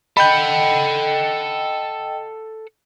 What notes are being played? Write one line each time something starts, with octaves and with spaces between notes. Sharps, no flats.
A4 D#5 F#5 G5 B5 G6